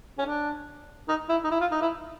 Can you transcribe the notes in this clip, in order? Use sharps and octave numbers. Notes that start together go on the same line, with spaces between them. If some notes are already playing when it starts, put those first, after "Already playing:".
C#4
D4
D#4
E4
D#4
E4
F4
D#4
E4